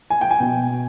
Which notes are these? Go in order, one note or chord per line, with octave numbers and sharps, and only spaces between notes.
G#5
G5
G#5
B2